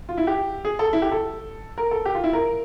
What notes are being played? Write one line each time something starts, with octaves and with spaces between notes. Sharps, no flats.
F4
E4
G4
G#4
A4
E4
G4
A4
A#4
A4
G4
F4
E4
A#4